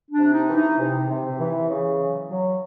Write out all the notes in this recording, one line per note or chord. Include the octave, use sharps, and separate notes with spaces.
D4
C3
D#4
E3
D#4
C3
C3
E3
C#3
F#3
F#3